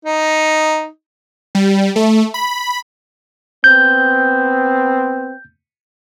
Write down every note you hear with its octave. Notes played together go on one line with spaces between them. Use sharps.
D#4
G3
A3
B5
B3 C4 G6